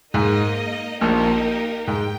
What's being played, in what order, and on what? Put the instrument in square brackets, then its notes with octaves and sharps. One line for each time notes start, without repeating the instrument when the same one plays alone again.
[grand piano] G#2 [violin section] A#3 D#4 A#4 D#5
[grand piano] A#1 A#2 [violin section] A#3 D#4 G4 A#4
[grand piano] G#2 [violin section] G5